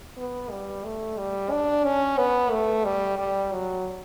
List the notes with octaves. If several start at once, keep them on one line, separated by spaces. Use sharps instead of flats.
B3
G3
A3
G3
D4
C#4
B3
A3
G3
G3
F#3